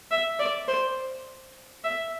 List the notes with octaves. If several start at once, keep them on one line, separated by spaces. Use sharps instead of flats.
E5
D5
C5
E5